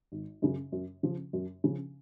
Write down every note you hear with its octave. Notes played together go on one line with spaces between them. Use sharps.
G#1
F#2 C#3
F#2
C#3 F3
F#2
C#3 F3